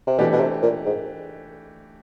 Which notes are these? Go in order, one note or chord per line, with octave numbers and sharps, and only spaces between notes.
C3
B2 E3 A3 D4 G4
B2
C3
A#2
G#2